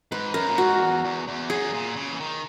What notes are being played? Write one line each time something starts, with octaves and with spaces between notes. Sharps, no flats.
G#2 B4
F#2 A#4
A#2
G#2 F#4
E2
E2
E2
F#2 G#4
A#2
C#3
E3
D#3